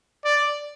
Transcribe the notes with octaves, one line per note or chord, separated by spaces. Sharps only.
D5